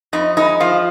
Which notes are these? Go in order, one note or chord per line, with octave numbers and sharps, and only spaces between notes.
F2 D#4
G#3 D#4
F3 F4